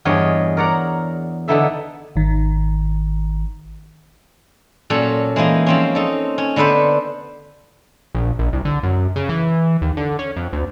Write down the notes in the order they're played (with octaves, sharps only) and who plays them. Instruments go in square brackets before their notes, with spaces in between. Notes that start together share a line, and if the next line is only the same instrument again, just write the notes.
[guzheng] E2 G2 G#4 C#5 D#5
A#4 C#5 D5 F#5 A#5
D3 B3 D#4 E4 A4 E5
[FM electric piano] G#1 D#3
[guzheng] A#2 F#3 C#4 A4
E3 G#3 A#3 D#4
F3 C4 C#4
D#4 A4
C#4
D3 B3 A4 B4 C5
[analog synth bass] A#1
A#1
C2
D3
F#2
C#3
E3
D#2
D3
C#4
F2
D2